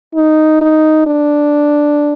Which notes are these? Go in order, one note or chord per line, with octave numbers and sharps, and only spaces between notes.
D#4
D#4
D4